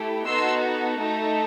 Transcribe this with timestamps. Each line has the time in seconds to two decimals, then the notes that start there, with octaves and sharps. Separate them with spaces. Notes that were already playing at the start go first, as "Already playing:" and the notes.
Already playing: A3 E4 G4
0.25 B3 D#4 F#4 A4 C6 E6
0.98 A3 D#4 A4